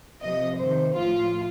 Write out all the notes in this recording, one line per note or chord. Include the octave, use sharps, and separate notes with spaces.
C3 F3 D#5
C3 D#3 C5
A2 F3 F4